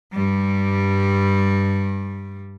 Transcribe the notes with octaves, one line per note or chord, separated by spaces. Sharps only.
G2 G3